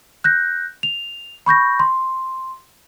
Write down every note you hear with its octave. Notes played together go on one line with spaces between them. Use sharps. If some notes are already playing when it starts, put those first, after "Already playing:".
F#6 G6 A#6
F7
B5 C#6 G6 A#6
C6